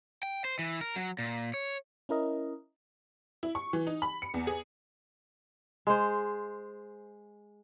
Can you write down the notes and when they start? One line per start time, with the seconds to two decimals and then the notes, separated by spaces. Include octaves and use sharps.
0.23 G5
0.45 C5
0.59 E3
0.81 A#4
0.96 F#3
1.19 A#2
1.54 C#5
2.09 C#4 E4 A#4 D#5
3.43 E4
3.55 C#6
3.73 E3
3.87 D#4
4.02 B5
4.22 C#7
4.34 E2
4.47 G#4
5.87 G#3 C5